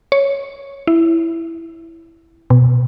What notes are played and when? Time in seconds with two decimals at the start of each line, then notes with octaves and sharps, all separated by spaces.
0.12 C#5
0.87 E4
2.50 B2